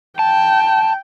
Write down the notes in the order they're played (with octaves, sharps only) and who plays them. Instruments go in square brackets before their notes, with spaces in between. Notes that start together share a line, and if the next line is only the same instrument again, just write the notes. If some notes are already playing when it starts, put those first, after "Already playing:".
[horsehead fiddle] G5 [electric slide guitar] A5